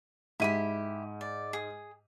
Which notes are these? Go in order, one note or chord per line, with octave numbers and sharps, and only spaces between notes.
G#2 E4 G4 B5 D#7
D5
G#4